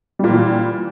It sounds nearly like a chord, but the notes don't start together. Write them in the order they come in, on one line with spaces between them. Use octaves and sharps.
G3 A#2 E3